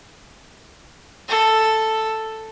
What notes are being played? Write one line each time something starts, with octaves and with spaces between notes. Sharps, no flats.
A4